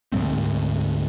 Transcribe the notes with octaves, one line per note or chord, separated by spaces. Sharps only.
D2 G#2 A3 C4